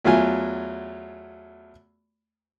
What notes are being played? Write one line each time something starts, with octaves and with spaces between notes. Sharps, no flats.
E2 F#3 A3 F4 G#5